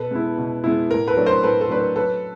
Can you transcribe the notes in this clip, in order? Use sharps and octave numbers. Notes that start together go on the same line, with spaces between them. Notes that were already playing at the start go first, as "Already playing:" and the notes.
Already playing: B2 A4 B4
G#3 B3 E4
B2
G#3 B3 E4
A2 A#4
A4 B4
F#3 A3 D4
A#4 C5
A2 A4 B4
A4
F#3 A3 D4 B4
A#4
F#3 A4 B4